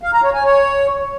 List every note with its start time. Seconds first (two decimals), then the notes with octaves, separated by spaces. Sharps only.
0.03 F5
0.13 A#5
0.24 C#5
0.34 G#5
0.44 C#5